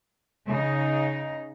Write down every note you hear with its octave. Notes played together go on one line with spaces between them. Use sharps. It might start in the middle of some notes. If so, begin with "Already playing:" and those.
C#3 D#4